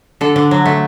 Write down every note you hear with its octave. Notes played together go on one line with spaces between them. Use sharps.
D3 A4
D3
F#3
A3